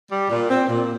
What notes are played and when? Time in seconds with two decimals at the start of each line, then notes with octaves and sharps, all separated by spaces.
0.10 G3
0.30 A#2
0.50 C4
0.69 A#2